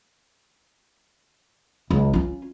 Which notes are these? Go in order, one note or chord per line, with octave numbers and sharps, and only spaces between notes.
C#2
C#4 F4